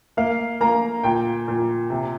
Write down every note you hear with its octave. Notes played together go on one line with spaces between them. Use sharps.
A#3 F5
A#3 A#5
A#2 G5
A#2
C3